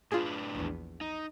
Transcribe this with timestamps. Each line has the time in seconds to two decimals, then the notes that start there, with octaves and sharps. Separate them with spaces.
0.12 A2 D4 F4 G#4 B4
0.55 A#1 E2
1.01 D#4